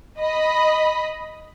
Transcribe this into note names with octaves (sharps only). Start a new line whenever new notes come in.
D#5 B5